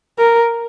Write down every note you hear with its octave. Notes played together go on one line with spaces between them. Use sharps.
A#4